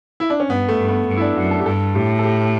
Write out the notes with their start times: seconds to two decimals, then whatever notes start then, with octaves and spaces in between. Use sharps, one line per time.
0.20 E4
0.30 D4
0.40 C#4
0.49 G2 B3
0.69 A3
0.78 G2
0.88 B3
1.07 G2
1.17 E4
1.21 D4
1.36 F#2 F#4
1.51 A4
1.60 G4
1.66 G2 A4
1.94 A2 G4
2.19 A4
2.24 G4